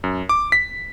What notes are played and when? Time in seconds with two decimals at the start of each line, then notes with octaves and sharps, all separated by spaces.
0.04 F#2
0.29 D6
0.52 B6